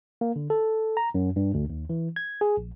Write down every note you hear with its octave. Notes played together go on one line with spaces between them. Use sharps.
A#3
D3
A4
A#5
F#2
G2
D2
D#2
E3
G#6
G#4
A#1